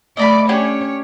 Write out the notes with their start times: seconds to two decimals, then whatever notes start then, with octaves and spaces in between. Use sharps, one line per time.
0.17 A3 D5 D#5 A#5 B5
0.49 C#4 D4 G4 C#5